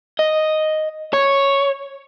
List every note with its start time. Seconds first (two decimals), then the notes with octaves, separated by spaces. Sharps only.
0.19 D#5
1.13 C#5